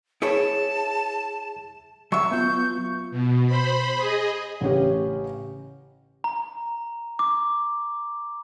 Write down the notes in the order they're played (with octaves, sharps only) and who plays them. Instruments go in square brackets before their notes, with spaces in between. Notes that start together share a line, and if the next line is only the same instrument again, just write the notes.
[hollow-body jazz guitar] E4 B4 C#5 [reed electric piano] G#4 [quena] A5
[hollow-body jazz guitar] F#3 E5 [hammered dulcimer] C#6 [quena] E6
[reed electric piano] B3 F4 [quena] G6
[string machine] B2
C5 B5
G#4 D#5
[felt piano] A1 C#3 C#4 G4
[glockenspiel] A#5
D6